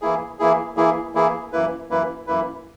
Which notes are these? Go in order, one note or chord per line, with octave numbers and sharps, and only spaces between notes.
E3 A#3 E4 G#4
E3 A#3 E4 G#4
E3 A#3 E4 G#4
E3 A#3 E4 G#4
F#2 E3 A#3 E4 B4
F#2 E3 A#3 E4 B4
F#2 E3 A#3 E4 B4